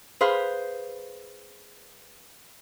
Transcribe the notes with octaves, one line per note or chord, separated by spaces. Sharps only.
G#4 B4 C5 F5